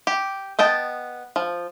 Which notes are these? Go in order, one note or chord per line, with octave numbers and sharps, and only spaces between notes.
G4
B3 D#5 G5 A5
F3